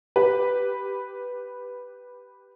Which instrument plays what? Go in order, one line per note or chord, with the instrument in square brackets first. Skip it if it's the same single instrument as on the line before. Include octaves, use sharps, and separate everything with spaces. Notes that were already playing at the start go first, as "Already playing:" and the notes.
[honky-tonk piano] G4 B4